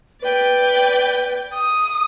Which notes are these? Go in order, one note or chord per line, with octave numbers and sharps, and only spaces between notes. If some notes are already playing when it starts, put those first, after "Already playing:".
B4 D5 G5
D#6